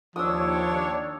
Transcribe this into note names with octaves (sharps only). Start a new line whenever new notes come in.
D#2 F3 D4 C#5 D#6 E6